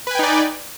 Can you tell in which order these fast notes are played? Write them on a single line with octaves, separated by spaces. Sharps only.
B4 G#5 G5 D#4 D5